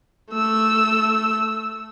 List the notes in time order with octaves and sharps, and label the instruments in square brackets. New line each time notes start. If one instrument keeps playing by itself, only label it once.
[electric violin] A3 E6